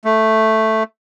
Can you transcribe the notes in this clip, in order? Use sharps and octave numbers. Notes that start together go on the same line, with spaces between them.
A3